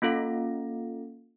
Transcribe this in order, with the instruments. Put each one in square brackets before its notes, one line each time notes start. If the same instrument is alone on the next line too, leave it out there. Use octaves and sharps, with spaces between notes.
[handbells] A#3 C#4 F4 A4 F5 A#6